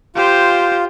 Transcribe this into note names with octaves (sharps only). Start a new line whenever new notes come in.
F4 G4 C5